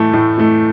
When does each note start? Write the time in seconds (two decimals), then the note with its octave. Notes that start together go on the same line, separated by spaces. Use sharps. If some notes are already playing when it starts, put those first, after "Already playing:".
Already playing: A2 E3 A3
0.13 A2
0.37 E3 A3